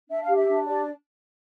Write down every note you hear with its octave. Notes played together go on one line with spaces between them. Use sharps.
D4 E5
F5
G4
E5
D4
G4 D5